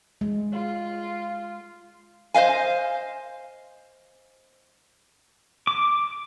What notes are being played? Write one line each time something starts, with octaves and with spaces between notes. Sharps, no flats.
G#3
F4
C5 D#5 F5 G#5
D6